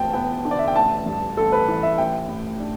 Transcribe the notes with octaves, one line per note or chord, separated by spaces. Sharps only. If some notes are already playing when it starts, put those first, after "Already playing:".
Already playing: E1 D2 G5 A5
B3 G5
D3
D5
E5
G5
A1 A5
G2
A1 A4
B4
E3
E5
A1 G5
A2
D4